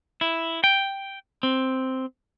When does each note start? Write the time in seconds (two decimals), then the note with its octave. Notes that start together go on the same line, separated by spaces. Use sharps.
0.21 E4
0.64 G5
1.43 C4